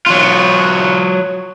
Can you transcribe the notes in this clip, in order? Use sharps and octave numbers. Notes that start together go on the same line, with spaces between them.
F#3 F4